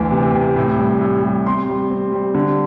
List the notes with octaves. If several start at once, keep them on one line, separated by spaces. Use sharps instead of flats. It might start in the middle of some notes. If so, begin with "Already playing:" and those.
Already playing: D2 E3
C3
C3
A2
G3
A2
G3
C4 C6
G3
C4
G3
D3